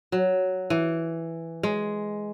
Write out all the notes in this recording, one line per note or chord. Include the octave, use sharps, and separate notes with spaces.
F#3
E3
G#3